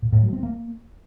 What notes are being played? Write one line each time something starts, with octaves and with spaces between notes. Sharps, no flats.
A#2
A2
F#3
C4
A#3